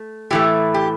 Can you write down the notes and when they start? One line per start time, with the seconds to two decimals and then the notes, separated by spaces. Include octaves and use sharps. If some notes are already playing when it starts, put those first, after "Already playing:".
Already playing: A3
0.31 A2 E3 A3 G4
0.74 G4